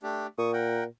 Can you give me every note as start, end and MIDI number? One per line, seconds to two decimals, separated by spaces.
0.03 0.27 57
0.03 0.27 62
0.03 0.27 67
0.38 0.84 46
0.38 0.51 85
0.38 0.51 87
0.53 0.84 70
0.53 0.84 78
0.53 0.84 79